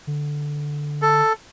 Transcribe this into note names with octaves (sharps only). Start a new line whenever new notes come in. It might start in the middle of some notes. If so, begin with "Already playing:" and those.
D3
A4